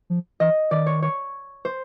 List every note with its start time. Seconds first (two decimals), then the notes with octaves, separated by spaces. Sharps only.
0.10 F3
0.40 E3 D#5
0.71 D#3 D5
0.86 C#5
1.02 C#5
1.65 C5